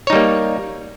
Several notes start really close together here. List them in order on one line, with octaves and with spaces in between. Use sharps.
C#5 D#4 G3 A#3